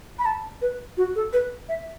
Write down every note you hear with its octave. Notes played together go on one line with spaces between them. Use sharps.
B5
A5
B4
F#4
A4
B4
E5